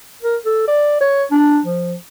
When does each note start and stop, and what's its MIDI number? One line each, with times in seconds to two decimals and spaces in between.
0.23 0.37 70
0.45 0.63 69
0.67 0.98 74
1.00 1.24 73
1.31 1.60 62
1.65 1.95 53